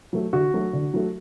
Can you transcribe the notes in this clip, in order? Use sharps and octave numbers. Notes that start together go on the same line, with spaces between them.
F#3 A3
D3 F#4
F#3 A3
D3
F#3 A3